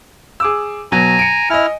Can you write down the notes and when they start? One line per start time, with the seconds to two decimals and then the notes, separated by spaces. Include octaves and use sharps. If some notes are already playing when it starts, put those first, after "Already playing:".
0.40 G#4 D6 E6
0.92 B2 F#3 G#5 A#5
1.19 C#7 D7
1.50 E4 D#5 G#5 F6